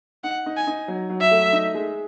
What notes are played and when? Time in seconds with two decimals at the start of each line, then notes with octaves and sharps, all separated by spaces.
0.24 D#4 F#5
0.46 D#4
0.57 G#5
0.67 D#4
0.88 F#3
1.10 F#3
1.21 E5
1.31 A3
1.53 D#4
1.74 G#3